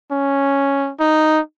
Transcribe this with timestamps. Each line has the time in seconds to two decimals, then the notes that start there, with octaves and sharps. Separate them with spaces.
0.11 C#4
1.00 D#4